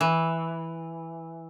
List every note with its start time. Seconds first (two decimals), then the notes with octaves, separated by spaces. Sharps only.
0.01 E3